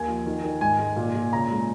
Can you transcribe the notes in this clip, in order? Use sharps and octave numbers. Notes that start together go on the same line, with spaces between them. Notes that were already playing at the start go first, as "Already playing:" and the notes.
Already playing: D#2 G#5
F3
D#3
D#3
G#2 G#5
G#3
A#2
A#2
C#3 A#5
G#3